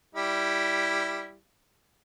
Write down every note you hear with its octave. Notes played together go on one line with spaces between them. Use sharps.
G3 E4